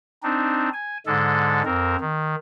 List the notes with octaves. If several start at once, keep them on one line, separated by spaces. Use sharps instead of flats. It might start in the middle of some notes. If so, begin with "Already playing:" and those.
C4 D4 D#4
G#5
G#2 D3 G#3 A4
F2 C4 A#4
D#3